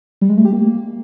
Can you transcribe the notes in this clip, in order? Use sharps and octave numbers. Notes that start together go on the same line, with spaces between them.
G3
G#3
A3
G4
A#3